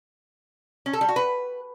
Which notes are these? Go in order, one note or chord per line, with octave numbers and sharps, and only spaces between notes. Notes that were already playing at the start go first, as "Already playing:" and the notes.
C#4
A4
G3
F#4
B4